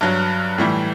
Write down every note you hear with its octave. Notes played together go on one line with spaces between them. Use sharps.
G2 F#3
A2 E3 G3